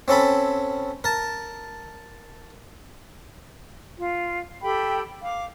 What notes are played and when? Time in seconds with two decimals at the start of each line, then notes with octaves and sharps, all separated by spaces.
0.08 C4 C#4 A4 B5
1.04 A#4 A5
3.98 F4
4.63 G4 A4 G5 B5
5.22 F5 D6